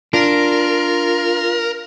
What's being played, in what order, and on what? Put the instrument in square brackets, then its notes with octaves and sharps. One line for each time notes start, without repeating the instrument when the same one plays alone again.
[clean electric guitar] D4 [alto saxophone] F4 [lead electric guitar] A#4